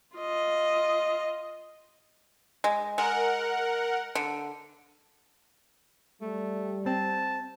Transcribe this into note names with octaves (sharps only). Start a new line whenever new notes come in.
F4 D#5
G#3
G#3 A#4 F#5
D3
G3 A3
C4 A5